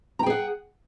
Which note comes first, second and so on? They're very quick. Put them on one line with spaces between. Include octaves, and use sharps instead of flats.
A#5 G5 G#4 F#5